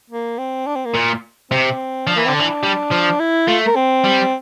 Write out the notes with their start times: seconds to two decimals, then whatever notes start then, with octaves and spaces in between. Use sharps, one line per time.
0.10 A#3
0.38 C4
0.67 D4
0.76 C4
0.85 A#3
0.94 A#2
1.51 C3 C4
2.07 F3 D4
2.16 E3 A#3
2.26 D3 C4
2.35 E3 D4
2.63 G3
2.91 F3
3.20 E4
3.48 A3 F4
3.66 A#4
3.76 C4
4.04 G3